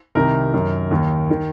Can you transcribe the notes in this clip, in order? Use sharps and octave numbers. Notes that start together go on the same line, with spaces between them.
C2 C3 D#3 A#4
F#2 D#3
D#2 D#3
D#3